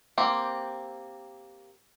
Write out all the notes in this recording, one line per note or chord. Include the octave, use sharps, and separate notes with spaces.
A#3 C4 G4